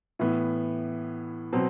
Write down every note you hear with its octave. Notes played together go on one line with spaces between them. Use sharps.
A2 E3 B3
B2 F#3 C4